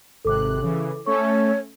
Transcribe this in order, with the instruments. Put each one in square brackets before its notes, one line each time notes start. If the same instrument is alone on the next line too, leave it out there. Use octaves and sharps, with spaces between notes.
[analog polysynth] G#1 C3 F#6 [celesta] A4 D6
[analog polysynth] C#3 E3
[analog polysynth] A3 C#4 A4 [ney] C#5 [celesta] C#6